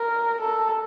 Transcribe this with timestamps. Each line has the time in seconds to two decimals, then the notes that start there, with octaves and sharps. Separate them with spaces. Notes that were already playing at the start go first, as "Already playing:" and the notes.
Already playing: A#4
0.41 A4